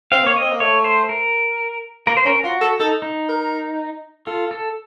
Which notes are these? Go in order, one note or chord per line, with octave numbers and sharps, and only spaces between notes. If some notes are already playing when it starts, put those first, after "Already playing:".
C4 F5
A#3 C#5
D#5
C4
A#3
A3 C#5
C5
A#4
A#3 A#4
C5
C#4 A#4
F4 F#4
A4
D#4 A4
D#4
A#4
F4 A4
A4